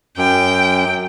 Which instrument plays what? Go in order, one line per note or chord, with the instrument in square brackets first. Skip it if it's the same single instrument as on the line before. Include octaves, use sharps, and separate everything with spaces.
[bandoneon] F#2 [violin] G5